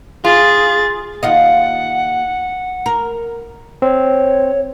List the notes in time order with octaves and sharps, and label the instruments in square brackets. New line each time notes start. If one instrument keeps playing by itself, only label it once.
[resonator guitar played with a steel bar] F4 [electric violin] G#4 A6
[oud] D#2 F4 D#5 [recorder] F#5
[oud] A#4
[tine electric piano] C4 [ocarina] C#5